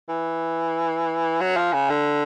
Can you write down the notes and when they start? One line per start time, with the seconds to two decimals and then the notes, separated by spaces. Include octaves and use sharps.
0.09 E3
1.40 F#3
1.57 F3
1.73 C#3
1.90 D3